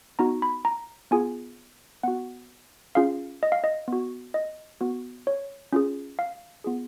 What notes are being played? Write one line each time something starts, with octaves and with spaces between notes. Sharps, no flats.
B3 D#4 F#4 A#5
B5
A#5
B3 F4 G#4 G#5
B3 F#4 F#5
C#4 F4 G#4 F5
D#5
F5
D#5
B3 F#4
D#5
B3 F#4
C#5
C#4 F4 G#4
F5
B3 F4 G#4